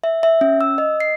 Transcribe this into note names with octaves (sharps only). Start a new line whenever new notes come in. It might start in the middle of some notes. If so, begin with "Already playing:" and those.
E5
E5
C#4
E6
D#5
C7